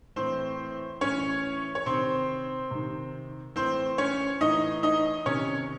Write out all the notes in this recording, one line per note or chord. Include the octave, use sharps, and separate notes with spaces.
A2 E3 C4 C5
A2 E3 C#4 C#5
C#5
C3 D#3 C4 C5
C3 D#3
A2 E3 C4 C5
C#4 C#5
A2 E3 D#4 D#5
D#4 D#5
C3 D#3 C#4 C#5